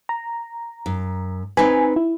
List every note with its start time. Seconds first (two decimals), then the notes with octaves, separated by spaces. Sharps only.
0.09 A#5
0.86 F#2
1.57 C4 D#4 B4 G#5
1.96 E4